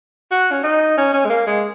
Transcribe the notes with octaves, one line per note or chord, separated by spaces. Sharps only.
F#4
C#4
D#4
C#4
C#4
G#3
A#3
G#3